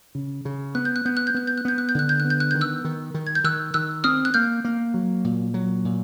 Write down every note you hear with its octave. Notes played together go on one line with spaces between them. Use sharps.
C#3
C#3
B3 F#6
G6
F#6
B3 G6
F#6
G6
B3 F#6
G6
F#6
B3 G6
F#6
G6
D3 F#6
G6
B3 F#6
G6
F#6
D#3 G6
E6 F#6
D#3
D#3
G#6
G6
D#3 E6 F#6
D#3 E6 F#6
C4 D#6 F6
F#6
A#3 F6 G6
A#3
F#3
A#2
F#3
A#2